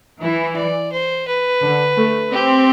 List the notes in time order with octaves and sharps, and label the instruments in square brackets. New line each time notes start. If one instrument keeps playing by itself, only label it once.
[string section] E3 [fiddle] E4
[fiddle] D5
C5
B4
[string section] D3
A3
[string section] C4 [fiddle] G4